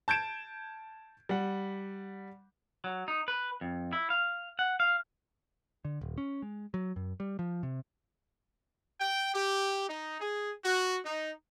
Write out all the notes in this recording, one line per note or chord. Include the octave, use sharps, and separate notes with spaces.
A5 G6 G#6 D7 E7
G3 F#5
F#3
D#4
B4
F2
E4
F5
F#5
F5
D3
D#1
C#4
G#3
F#3
F#2
G3
F3
C3
G5
G4
D#4
G#4
F#4
D#4